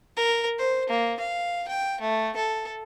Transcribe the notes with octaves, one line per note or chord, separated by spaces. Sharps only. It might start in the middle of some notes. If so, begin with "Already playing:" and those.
A#4
C5
A#3
F5
G5
A3
A4